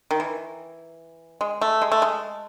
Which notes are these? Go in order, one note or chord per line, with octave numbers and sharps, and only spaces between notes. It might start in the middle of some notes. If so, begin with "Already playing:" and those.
D#3
E3
G#3
A3
G#3
A3
G#3